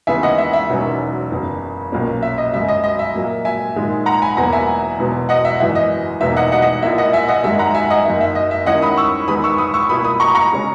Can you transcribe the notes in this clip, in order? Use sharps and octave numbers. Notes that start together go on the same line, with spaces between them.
D#2 C#3 E3 B3 E5 G#5
D#5 F#5
E5
E5
E1 E2 D#3 F#3 C#4
F#1 E2 C#3
B1 A#2 A#3 C#4
E5
D#5
G#1 F#2 C#3 E5
D#5
D#5
E5
A#2 F#3 A#3
E5 G#5
A#1 G#2 D#3 G#3
F#5 A#5
G#5 B5
E1 E2 B2 F#3 A#3 F#5 A#5
E5 G#5
E1 E2 B2
D#5 F#5
E5
G#1 F#2 E3 E5
D#5
E1 E2 B2 A#3 D#4 E5
D#5 F#5
D#5 F#5
D#5 F#5
A#1 A#2 A#3 E4 E5
D#5 F#5
E5 G#5
D#5 F#5
G#1 F#2 D#3 G#3 E5
F#5 A#5
E5 G#5
D#5 F#5
F#1 F#2 D#3 A#3 E5
E5
D#5
E5
D#2 D#3 A#3 C#4 E4 D#5 F#5
B5 D#6
C#6 E6
E2 D#3 G#3 B3 D#4 B5 D#6
C#6 E6
B5 D#6
C#6 E6
C#2 B2 A#3 E4 B5 D#6
B5 D#6
A#5 C#6
A#5 C#6
C#3 G#3 C#4